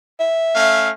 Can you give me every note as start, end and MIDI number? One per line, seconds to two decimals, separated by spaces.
0.20 0.89 76
0.55 0.90 57
0.55 0.90 61
0.55 0.90 77